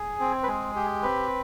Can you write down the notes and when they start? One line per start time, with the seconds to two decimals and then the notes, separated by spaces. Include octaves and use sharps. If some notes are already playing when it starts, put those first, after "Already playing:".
Already playing: G#4
0.20 C4
0.43 B4
0.47 G#3 G#4
0.76 G4
1.03 C4 B4